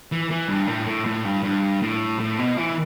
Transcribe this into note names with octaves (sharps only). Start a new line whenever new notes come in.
E3
E3
G2
A2
A2
A2
G2
G2
A2
A2
B2
E3